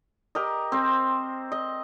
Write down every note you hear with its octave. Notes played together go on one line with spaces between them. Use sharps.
G4 A#4 D#5
C4 C5
D#5